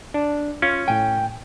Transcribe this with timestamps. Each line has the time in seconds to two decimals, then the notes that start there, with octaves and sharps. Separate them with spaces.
0.14 D4
0.62 C#4 F4
0.88 A2 G5 G#5